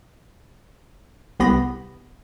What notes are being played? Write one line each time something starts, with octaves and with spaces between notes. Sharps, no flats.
C2 B3 G4 B5 A#6